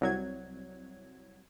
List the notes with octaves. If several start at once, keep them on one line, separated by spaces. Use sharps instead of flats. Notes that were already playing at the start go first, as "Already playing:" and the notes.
C2 F#3 G#6